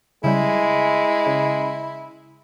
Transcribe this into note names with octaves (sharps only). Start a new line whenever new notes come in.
C#3 G3 G#3 E4
C#3